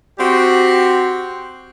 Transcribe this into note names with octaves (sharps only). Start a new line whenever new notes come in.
C4 F#4 G4